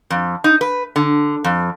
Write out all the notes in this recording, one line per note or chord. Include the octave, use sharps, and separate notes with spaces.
F2
D#4
B4
D3
F2